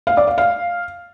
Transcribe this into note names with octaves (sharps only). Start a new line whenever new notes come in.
F5
D5
F5
F5